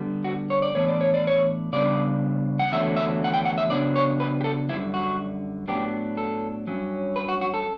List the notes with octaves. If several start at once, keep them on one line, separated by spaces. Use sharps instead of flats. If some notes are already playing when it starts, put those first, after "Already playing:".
Already playing: D3 G3 B3
F#4
C#5
D5
A2 E3 B3 D4 C#5
D5
C#5
D5
C#5
C#3 G3 B3 D4 D5
F#5
E2 D3 F#3 A3 E5
E5
F#5
G5
F#5
E5
C#3 F#3 B3 D4 D5
C#5
B4
G4
A4
F#2 D3 G3 E4
F#4
A2 F#3 B3 D4 G4
A4
G2 F#3 C#4
B4
F#4
F#4
A4